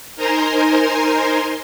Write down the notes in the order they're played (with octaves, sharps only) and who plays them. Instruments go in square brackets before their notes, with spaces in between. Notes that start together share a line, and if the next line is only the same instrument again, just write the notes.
[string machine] D#4 A#4 C5 G#5 A#5 C6